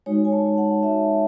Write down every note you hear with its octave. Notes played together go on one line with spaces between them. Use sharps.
G#3 D#4 F#4 C#5
G#5
A5
F#5
G#3 D#4 F#4 E5